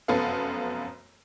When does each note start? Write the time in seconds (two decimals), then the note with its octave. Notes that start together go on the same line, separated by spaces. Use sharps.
0.08 F1 F#2 B3 A4 F5